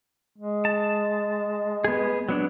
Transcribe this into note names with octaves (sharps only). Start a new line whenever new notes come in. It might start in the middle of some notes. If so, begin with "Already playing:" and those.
G#3
A5
B3 G#4
F#3 B3 D4